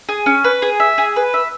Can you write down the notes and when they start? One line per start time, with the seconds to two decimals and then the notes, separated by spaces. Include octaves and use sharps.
0.09 G#4
0.26 C#4
0.44 B4
0.62 G#4
0.80 E5
0.98 G#4
1.16 B4
1.34 E5